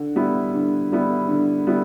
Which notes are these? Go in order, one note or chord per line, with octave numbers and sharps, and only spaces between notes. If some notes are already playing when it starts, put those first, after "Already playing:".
Already playing: D3
G3 B3 E4
D3
G3 B3 E4
D3
G3 B3 E4